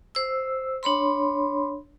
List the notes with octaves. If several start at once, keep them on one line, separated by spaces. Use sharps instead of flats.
C5 E6
D4 C#5 B5 C6